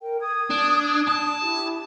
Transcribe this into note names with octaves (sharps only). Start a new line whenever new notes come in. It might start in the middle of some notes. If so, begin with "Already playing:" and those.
A#4 G5
D#6 G#6
D4
A5
E4 G4